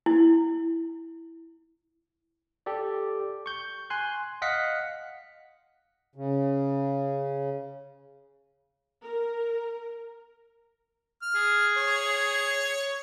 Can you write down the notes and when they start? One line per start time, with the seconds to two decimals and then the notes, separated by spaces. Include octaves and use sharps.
0.06 E4
2.66 G4 A4 D5
3.46 C#6 G6
3.90 G#5 C6 F#6
4.42 D#5 F5 F#5 B6 C#7
6.16 C#3
9.02 A#4
11.22 F6
11.36 G#4
11.77 C#5